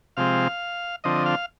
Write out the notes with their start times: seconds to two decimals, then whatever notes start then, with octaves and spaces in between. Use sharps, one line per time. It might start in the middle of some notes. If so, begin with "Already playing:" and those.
0.17 C3 F3 G#3 C4 F5
1.04 D3 F3 C4 D#5
1.26 F5